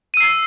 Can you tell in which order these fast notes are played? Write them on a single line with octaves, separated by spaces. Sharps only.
D#7 E6 C7